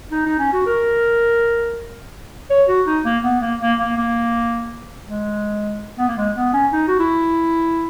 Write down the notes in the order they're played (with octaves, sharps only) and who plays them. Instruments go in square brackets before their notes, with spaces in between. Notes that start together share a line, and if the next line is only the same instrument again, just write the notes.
[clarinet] D#4
D#4
C#4
F#4
A#4
C#5
F#4
D#4
A#3
B3
A#3
A#3
A#3
A#3
G#3
B3
A#3
G#3
B3
C#4
D#4
F#4
E4